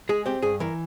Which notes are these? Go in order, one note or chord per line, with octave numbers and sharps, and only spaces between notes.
G#3 G#4
C4 G4
G2 G#4
E3 A#4